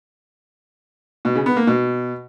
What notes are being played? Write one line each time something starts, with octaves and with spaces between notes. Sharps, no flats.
B2
C#3
B3
A#3
B2